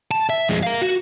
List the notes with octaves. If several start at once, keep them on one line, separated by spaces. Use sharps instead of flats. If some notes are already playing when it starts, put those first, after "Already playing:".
A5
E5
F2 G#3
A#4 F5
F#4